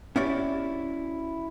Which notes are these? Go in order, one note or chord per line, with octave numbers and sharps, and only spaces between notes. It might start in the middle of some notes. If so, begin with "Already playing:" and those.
C#4 E4 F#4 G4 C#5 D5